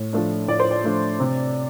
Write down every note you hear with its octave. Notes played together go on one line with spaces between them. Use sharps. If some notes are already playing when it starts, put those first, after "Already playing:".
Already playing: A2
F3 A3 D4
A2 D5
C5
D5
F3 A3 D4
C3